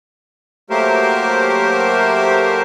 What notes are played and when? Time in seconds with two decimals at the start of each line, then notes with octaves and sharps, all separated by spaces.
0.70 F#3 A3 A#3 G4 A#4 C5